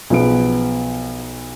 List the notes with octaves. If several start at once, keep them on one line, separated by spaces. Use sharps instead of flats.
B1 F3 B3 G#4 D7